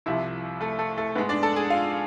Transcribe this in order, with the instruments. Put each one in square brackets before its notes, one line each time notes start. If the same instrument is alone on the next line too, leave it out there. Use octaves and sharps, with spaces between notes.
[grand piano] C2 C3 F3 E4 E5
A3 A4
A3 A4
A3 A4
G#2 G#3 B3 B4
D4 D5
A4 A5
G#4 G#5
F4 F5